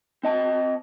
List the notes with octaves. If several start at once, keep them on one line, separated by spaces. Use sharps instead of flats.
C4 D#5 A5